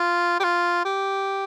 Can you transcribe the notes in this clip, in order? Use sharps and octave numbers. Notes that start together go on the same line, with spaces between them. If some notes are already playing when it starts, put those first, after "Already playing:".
Already playing: F4
G4
F4
G4